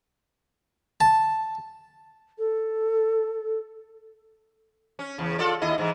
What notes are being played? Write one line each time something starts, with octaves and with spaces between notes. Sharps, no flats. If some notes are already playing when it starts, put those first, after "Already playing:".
A5
A4
C#4
E2 C#3
F4 A4 D5
D#2 E4 D#5
G#2 E3